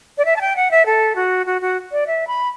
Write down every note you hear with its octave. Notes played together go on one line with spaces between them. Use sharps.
D5
E5
A5
G5
F#5
E5
A4
F#4
F#4
F#4
D5
E5
B5